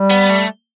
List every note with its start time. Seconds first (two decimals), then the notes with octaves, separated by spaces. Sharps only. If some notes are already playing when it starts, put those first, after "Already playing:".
Already playing: G3
0.10 B3
0.30 A3